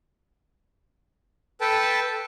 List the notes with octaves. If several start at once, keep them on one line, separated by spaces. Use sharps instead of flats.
A4 B4 G5 A5